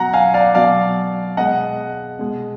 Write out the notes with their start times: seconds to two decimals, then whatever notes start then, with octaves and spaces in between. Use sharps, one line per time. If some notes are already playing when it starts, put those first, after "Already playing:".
Already playing: B2 F#3 F#5 A#5
0.13 F5 G#5
0.34 D5 F5
0.54 B2 F#3 D5 F5
1.37 B2 G#3 D#5 F#5
2.19 B2 G#3